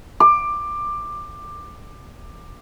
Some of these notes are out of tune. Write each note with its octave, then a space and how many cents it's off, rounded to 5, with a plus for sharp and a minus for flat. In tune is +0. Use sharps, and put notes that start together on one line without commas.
D6 +15